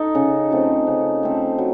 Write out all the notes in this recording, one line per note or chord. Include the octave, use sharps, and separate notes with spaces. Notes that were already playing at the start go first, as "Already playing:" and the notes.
Already playing: D#4 A4
C#3
F3 A3 C4
C#3
F3 A3 C4
F#3